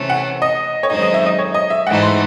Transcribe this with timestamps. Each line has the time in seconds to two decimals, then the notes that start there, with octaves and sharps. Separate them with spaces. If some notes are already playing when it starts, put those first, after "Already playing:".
Already playing: C3 E3 A3 C#4
0.10 F#5
0.42 D#5
0.83 C#5
0.90 F#2 D#3 G#3 C4 D#4 D#5
1.02 D#5
1.14 E5
1.26 D#5
1.39 C#5
1.54 D#5
1.70 E5
1.87 G#2 E3 A3 D#4 F#5
2.02 C6